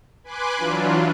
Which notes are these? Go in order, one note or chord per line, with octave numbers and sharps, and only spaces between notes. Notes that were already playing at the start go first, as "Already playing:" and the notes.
B4 G#5 B5 C6 D6 F#6
E3 F#3 D4 F4